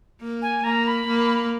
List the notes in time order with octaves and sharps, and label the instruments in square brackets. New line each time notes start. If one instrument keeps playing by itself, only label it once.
[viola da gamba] A#3
[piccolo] G#5
[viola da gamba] A#3 [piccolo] A#5
[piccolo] B5
[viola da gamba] A#3